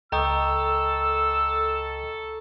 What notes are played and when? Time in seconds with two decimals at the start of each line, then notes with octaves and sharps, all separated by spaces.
0.12 C#2 A4 D#5 G5 A#5 C#6 D#6 E6